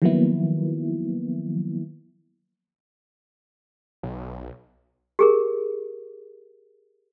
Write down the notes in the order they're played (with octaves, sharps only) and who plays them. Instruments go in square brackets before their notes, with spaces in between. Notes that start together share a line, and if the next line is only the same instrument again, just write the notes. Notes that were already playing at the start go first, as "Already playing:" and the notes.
[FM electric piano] D#3 F3 F#3 A#3 B3 E4
[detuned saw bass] B1
[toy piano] G4 G#4 A#4